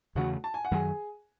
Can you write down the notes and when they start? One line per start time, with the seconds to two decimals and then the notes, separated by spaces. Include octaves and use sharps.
0.15 E2 C#3 E3 A3 F#4 F#5
0.44 A5
0.54 G#5
0.65 F#5
0.71 F#2 D#3 F#3 G#4 G#5